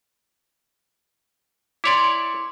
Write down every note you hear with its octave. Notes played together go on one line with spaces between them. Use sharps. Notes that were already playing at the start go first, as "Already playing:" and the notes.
E4 C#5 D5 C6 D6